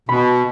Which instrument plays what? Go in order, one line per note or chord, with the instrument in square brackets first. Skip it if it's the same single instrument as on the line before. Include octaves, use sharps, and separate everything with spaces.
[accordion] B2 [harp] B5